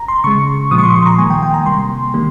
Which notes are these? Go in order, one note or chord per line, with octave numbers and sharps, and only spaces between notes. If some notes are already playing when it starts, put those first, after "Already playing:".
Already playing: A#5
C6
C#3 G#3 C#6
A#2 F3 G#3 D#6
C#6
C6
C6
A#5
D#3 G3 A#3 G#5
G5
G5
A#5
C3 G3 A#3 C6
D#3 G3 A#3